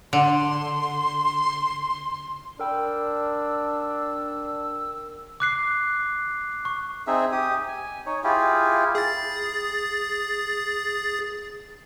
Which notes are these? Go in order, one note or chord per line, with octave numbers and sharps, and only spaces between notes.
D3 C6
D4 A#4 G5 B5 E6
D6 F#6 C7
C#6
C4 D#4 G#4 E5
G4 D#6
G#5
D#4 C#5
E4 F4 G4 G#4
G#4 A6